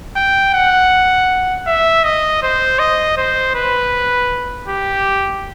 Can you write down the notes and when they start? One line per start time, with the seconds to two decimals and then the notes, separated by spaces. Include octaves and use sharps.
0.16 G5
0.54 F#5
1.67 E5
2.04 D#5
2.43 C5
2.79 D#5
3.17 C5
3.55 B4
4.68 G4